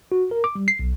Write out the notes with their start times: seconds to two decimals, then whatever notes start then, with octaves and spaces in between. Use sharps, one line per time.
0.12 F#4
0.31 A#4
0.44 D6
0.55 G3
0.68 C7
0.79 B1